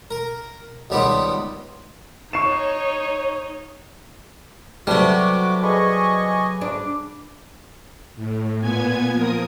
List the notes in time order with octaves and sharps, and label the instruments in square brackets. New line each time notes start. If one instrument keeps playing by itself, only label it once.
[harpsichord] A#4
C#2 D#3 G3 B3 C4
[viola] D#4 [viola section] C#5 [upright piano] C#6 C7 E7
[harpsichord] C3 G3 [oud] F#3 [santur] A3 B4 D5 [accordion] F#4 D6
[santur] G#4 B4 D5 [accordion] D#5 G#5 C#6
[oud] D4 [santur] D5 D6
[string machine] A2
A#2 B3 G#5 G#6
F3 A#4 D#6